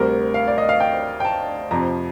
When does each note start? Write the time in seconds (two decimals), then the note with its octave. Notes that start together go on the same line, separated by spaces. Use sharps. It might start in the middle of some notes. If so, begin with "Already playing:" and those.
Already playing: D2 C3 G3 A#4
0.34 F5
0.48 D5
0.58 D#5
0.69 F5
0.80 G5
1.20 G5
1.25 A5
1.71 F2 C3 F3 A#5